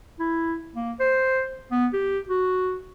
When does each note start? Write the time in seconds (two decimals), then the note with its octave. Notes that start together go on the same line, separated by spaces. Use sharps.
0.20 E4
0.75 A#3
1.00 C5
1.72 B3
1.94 G4
2.29 F#4